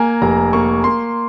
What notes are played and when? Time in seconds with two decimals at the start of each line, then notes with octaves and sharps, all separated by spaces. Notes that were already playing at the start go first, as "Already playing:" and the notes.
Already playing: A#3 G#5 A#5
0.22 F1 A#5
0.53 A#3 C#6
0.84 A#3 C6